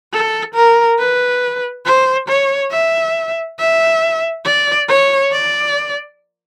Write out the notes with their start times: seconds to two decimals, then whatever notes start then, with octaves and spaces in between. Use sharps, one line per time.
0.13 A4
0.55 A#4
0.99 B4
1.86 C5
2.28 C#5
2.72 E5
3.59 E5
4.45 D5
4.88 C#5
5.32 D5